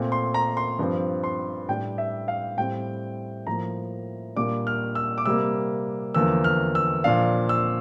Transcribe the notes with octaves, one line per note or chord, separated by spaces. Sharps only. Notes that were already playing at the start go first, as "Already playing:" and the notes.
Already playing: A#2 A3 C4
C6
A#5
C6
G2 F3 C4
C6
A2 G3 D4 G5
E5
F5
A2 G3 C4 G5
A2 F3 A#3 A#5
A#2 G3 A#3 D4 D6
F6
E6
D6
C3 G3 A#3 E6
E2 D3 F3 A#3 E6
F6
E6
A#2 F3 A#3 D4 F5
E6